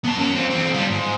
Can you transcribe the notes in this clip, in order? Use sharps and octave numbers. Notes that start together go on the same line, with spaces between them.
B3 A5
F#2 C#4
C4 F4
E2 C4
G3 F4
G#2